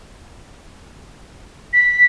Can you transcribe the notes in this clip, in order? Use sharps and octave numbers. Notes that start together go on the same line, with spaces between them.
B6